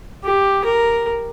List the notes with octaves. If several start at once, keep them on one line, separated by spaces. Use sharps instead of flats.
G4
A#4